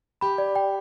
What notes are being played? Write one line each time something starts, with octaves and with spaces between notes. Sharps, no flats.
G4 B5
D5
G5